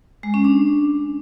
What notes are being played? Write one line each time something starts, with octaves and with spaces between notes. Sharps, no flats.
G#3
C#4
D4